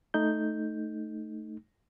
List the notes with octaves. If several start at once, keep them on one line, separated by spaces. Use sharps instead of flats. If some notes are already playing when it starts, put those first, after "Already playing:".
A3 D#4 G6